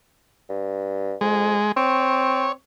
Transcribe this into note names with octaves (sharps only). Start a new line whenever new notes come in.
G2
F2 G#3
C4 C#5